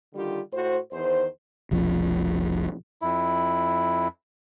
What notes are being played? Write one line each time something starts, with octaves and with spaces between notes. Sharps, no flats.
D3 D#3 G3 F4 G4
A2 F#4 C5
E2 D#3 C5
F1 B1 F3
F2 E4